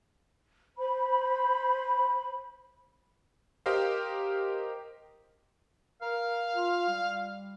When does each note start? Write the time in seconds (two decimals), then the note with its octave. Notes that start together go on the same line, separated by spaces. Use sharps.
0.77 C5 B5
3.66 G4 A#4 C5 D#5 F5
6.02 A#4 F5
6.56 F4
6.89 G3